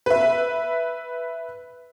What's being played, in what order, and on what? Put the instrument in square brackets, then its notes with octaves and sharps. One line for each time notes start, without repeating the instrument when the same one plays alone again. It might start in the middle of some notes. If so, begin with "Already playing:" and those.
[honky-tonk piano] B4 E5